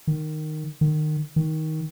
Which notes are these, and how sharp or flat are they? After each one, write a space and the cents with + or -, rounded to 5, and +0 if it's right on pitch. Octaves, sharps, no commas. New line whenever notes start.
D#3 -10
D#3 -25
D#3 +15